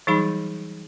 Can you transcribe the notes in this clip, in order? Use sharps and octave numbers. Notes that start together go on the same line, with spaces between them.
E3 F#3 G3 D#4 G#4 B5